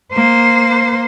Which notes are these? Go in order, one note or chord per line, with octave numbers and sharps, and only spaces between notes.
A#3 C5